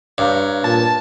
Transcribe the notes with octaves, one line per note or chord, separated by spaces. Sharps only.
G2 C#5 F5 A#5
A#2 A5